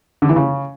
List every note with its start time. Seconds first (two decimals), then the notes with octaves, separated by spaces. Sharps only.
0.22 D3
0.29 E3
0.36 C#3